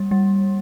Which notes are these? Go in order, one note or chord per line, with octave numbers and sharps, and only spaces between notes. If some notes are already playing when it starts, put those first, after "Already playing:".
Already playing: G3 A#3
G3